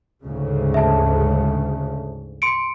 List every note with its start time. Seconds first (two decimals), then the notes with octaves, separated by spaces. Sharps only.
0.25 D2 G#2 C#3
0.74 E5 A5
2.42 C6 C#7 D7